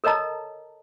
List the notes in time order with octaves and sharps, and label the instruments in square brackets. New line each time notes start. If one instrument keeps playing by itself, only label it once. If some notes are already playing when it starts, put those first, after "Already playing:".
[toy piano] A4 A#4 C#5 D#5 A5 A#5